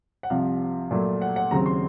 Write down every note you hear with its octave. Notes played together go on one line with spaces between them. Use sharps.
F#5
C2 C3 F3 F5
A#2 F#3 A3
F#5
F#5
D#2 C#3 F#3 C4 A#5
C6